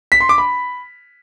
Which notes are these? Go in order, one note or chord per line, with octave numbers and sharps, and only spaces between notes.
B6
C6
D6
B5